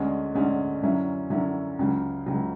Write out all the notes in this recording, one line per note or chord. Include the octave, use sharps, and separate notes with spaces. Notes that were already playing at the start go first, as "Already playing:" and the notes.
Already playing: D2 D3 G#3 C#4
D2 D3 G#3 C#4
F#2 D3 F#3 C#4 E4
F#2 D3 F#3 C#4 E4
C#2 C#3 F#3
C#2 C#3 F#3